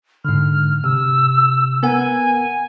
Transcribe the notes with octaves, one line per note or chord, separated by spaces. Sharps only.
G#2 D3 F6
C3 E6
B3 A#4 F#5 G#5